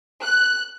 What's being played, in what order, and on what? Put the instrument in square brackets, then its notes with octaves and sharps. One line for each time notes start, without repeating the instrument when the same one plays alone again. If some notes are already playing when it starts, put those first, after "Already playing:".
[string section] F#6